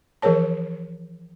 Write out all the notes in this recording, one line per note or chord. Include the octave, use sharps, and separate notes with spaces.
E3 F3 G#4 A#4 C#5 A5